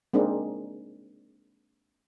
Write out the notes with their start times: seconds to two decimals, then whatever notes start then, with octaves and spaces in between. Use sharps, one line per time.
0.13 G#3 A#3 C4 D4 D#4